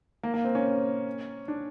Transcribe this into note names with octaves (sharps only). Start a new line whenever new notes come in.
A#3
A#3
C4
C#4
D4